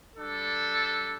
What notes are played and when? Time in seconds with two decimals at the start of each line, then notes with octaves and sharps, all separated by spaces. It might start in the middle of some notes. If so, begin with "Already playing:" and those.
0.16 G3 D4 A4